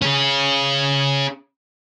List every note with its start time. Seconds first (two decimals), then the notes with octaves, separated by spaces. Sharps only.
0.02 C#4 G#4